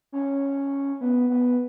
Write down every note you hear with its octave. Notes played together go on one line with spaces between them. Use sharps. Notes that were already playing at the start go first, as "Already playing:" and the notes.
C#4
B3
B3